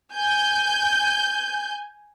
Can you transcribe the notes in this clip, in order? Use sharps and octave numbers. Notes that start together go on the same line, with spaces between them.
G#5 G6